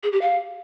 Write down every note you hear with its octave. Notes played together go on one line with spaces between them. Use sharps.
G#4
G4
F5